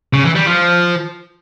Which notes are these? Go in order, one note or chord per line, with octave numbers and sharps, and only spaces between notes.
C#3
E3
G3
F3